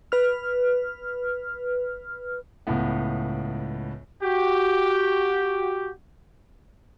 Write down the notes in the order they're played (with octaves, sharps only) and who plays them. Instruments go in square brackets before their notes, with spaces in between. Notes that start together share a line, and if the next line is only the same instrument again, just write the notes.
[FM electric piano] B4 F6
[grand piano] C#2 A2 B3
[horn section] F#4 G4